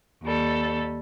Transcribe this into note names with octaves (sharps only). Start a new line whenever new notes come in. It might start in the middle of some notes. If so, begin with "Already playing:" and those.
D#2 G3 A4